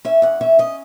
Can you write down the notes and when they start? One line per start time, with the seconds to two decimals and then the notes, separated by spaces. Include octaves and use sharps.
0.05 C#4 E5
0.22 E2 F#5
0.41 C#4 E5
0.59 C#4 D#5